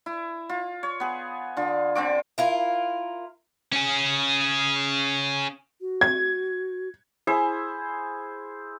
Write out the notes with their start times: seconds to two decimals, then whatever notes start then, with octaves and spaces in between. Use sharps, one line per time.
0.06 E4
0.49 F4
0.83 C#5
1.00 B3 G#4
1.57 D3 F4
1.95 D3 C4 F4 D6
2.38 E4 F4 A#4
3.73 C#4 G#4
5.81 F#4
6.01 G#6
7.27 E4 G#4 C5 E5